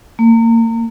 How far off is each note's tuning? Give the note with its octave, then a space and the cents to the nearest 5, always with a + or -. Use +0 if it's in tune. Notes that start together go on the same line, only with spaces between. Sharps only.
A#3 -30